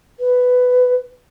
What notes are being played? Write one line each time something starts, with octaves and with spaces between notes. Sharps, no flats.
B4